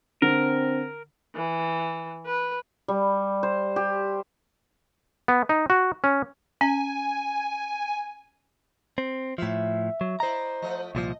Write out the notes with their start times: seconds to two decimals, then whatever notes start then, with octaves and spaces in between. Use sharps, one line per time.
0.22 D3 C4 A#4
1.35 E3
2.26 B4
2.88 G3
3.43 C5
3.76 G4
5.28 B3
5.49 D#4
5.70 F#4
6.04 C#4
6.61 C#4 G#5
8.98 C4
9.38 A2 F3 E5
10.01 F#3
10.20 E4 C5 D5 D#5 A#5
10.62 F3 A3 D#5
10.95 C2 A#2 F3 D#5